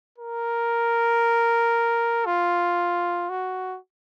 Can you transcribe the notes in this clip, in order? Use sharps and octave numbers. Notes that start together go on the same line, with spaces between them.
A#4
F4
F#4